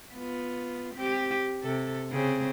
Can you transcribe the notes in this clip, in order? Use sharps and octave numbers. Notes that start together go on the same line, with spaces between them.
B3 F4
C4 G4
C3 A4
C#3 C4 G#4